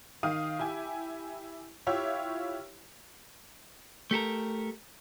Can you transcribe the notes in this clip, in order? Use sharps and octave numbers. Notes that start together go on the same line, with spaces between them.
D#3 F5 D#6 D#7
E4 G4 G#5
E4 F4 G4 C#5 E5
A3 G4 A4 A#4